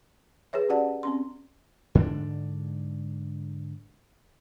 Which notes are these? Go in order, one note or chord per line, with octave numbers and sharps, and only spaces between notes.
G#4 B4 C#5 E5
C#4 F#4 G4 D5 F#5 A5
C4 C#4 C6
G#2 D3 C4 D4